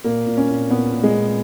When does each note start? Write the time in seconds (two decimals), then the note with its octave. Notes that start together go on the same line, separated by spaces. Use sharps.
0.04 A#2 A#3
0.26 A#2
0.37 C#4
0.48 A#2
0.70 A#2 B3
0.93 A#2
1.03 G#3
1.15 A#2